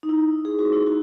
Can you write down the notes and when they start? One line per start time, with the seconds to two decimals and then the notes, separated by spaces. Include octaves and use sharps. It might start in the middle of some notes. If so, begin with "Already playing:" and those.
0.03 D#4
0.09 E4
0.45 G#4
0.59 F#4
0.73 E4
0.86 D#4 F#4